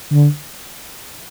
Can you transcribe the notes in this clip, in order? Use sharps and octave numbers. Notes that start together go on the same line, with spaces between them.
D3